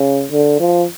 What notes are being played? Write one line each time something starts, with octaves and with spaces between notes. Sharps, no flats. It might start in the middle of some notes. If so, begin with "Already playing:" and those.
Already playing: C#3
D3
F3